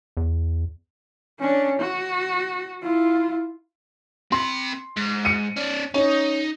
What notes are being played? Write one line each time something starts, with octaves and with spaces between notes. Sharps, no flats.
E2
C#4 D4
F#4
E4 F4
C4 B5 C6
G#2
C#7 D#7
C#4 D5
C#4 D#4